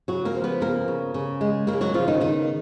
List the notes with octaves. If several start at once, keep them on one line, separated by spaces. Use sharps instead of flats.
C#3 F#3 F#4
A#3 A#4
F3
B3 B4
C#3 A#3 A#4
C#3
C#3
G#3
C#3 A#3 A#4
F#3 F#4
C#3 F3 F4
D#3 D#4
D#3 B3 D#4